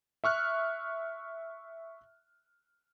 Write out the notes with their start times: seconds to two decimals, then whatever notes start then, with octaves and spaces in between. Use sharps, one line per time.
0.24 E5 C#6 F6 F#6